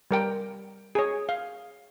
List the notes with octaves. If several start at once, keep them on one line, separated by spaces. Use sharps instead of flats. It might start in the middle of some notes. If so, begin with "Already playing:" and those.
G3 A#4 G5
G#4 C#5
F5